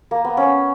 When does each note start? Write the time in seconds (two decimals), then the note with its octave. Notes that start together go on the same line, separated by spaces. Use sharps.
0.11 A#3
0.24 B3
0.37 C#4